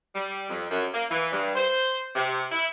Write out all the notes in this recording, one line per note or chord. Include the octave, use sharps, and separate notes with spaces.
G3
F2
F#2
A#3
E3
G2
C5
C3
E4